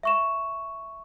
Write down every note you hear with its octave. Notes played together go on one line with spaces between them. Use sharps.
E5 C#6 E7